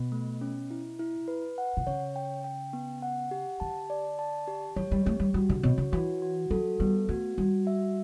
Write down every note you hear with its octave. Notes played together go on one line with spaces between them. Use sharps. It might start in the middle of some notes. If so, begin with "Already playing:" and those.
Already playing: B2
A3
C#4
E4
E4
B4
F#5
B2
C#3 C#5
G5
G5
B3
F#5
G4
D3 A5
D5
A5
G4
F#3 C#5
G3
A3 G4
G3
G3 F#4
D3
B2 C#5
C#3
E3 F#4
F#4
F#3 A4
G3 B3
A3 F#4
G3 F#4
E5